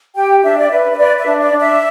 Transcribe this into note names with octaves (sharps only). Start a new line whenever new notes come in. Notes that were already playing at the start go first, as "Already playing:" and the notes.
G4 G5
D4 E5
D5
B4 E5
E5
B4 D5
E5
D4
D5
D4
E5